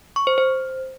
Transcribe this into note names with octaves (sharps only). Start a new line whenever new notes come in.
C#6
C5
C5